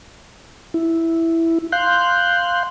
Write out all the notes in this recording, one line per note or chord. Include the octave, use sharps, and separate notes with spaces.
E4
F5 C6 F#6 G6